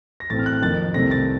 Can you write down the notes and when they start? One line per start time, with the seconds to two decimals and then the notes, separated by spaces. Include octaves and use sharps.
0.20 A#6
0.30 A1 A2 A3 C4 A6
0.39 F6
0.46 F#6
0.62 F2 D#3 A#3 A6
0.94 C2 C3 D#3 A3 C4 A#6
1.11 A6